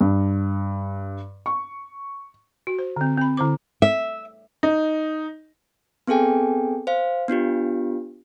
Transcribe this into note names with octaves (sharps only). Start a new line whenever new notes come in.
G2
C#6
F#4
C5
D3 C4
C4 B5
D3 E4 C5 D6
E5
D#4
B3 C4 G#4 A4 G5 G#5
C5 F5
B3 D4 F4 G4